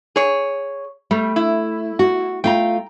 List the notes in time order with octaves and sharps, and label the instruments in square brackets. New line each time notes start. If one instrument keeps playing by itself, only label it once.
[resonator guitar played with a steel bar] G#4 C#5
[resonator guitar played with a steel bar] G3 [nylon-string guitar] A3
[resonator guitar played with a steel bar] E4
[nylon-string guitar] F#4
[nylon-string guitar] A3 F4 [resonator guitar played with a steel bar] G5 A#5